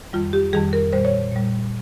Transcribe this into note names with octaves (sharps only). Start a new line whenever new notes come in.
F2 D#3 G3 F4
G4
F2 D#3 G3 G#4
A#4
A#2 G3 C5
C#5
A#2 G3